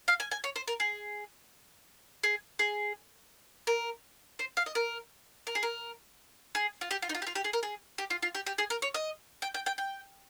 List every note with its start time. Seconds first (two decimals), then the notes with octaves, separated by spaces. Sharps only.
0.08 F5
0.20 G#5
0.31 G#5
0.44 C#5
0.56 C5
0.68 A#4
0.80 G#4
2.23 G#4
2.59 G#4
3.67 A#4
4.39 C5
4.57 F5
4.66 D#5
4.75 A#4
5.47 A#4
5.55 G#4
5.63 A#4
6.55 G#4
6.81 F4
6.91 G4
7.02 F4
7.09 D#4
7.15 F4
7.22 G4
7.27 F4
7.35 G4
7.44 G#4
7.53 A#4
7.63 G#4
7.98 G4
8.10 F4
8.23 F4
8.35 G4
8.47 G4
8.58 G#4
8.70 A#4
8.82 C#5
8.94 D#5
9.42 G5
9.54 G5
9.66 G5
9.78 G5